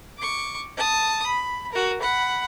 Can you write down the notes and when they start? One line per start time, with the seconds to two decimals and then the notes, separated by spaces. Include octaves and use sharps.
0.18 C#6 D6
0.77 A5 D#6
1.26 B5
1.72 F#4 A#4
2.01 F#5 B5